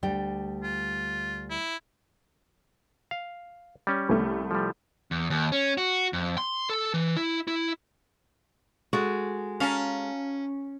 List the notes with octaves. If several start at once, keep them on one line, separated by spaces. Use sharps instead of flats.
D2 G3 G5
F4
E4
F5
G3 C#4
C2 A3
F3 G3
E2
D#2
C#4
F#4
F2
C6
A4
E3
E4
E4
G#3 F#4 G#4 A4
C#4 F5 A5 A#5